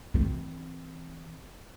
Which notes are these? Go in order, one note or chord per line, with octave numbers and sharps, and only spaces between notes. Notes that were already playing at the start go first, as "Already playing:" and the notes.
E3 C4